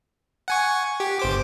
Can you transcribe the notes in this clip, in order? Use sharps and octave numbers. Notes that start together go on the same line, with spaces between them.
F#5 G#5 C#6
G4
G1 C5 D6